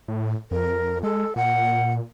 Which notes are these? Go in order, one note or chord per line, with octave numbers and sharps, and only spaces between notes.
A2
F2 A#4
G#3 A4
A#2 F#5